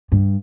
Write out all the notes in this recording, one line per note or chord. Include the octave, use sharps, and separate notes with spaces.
G2